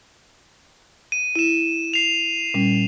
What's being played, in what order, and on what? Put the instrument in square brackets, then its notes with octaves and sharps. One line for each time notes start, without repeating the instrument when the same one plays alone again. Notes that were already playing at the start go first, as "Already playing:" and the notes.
[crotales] D#7
[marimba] E4 [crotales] D#7 E7
[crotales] C7 F7
[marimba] A#2 G3 C#4